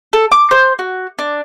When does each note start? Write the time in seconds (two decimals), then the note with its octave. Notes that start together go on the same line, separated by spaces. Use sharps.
0.13 A4
0.32 D6
0.51 C5
0.79 F#4
1.19 D4